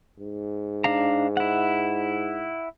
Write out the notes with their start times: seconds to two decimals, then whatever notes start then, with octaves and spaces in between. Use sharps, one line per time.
0.20 G#2
0.84 D4 F5 A#5
1.37 E4 F#5